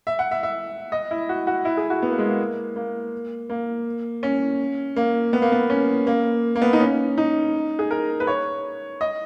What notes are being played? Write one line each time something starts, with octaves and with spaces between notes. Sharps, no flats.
E5
F#5
E5
E5
D#5
E4
F#4
F#4
E4
G#4
F#4
B3
A#3
G#3
A#3
A#3
A#3
C#4
A#3
B3
A#3
B3
C#4
A#3
A#3
B3
D#4
C#4
D#4
G#4
A#4
B4
C#5
D#5